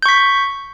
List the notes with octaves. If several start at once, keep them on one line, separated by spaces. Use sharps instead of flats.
C#6 G6 B6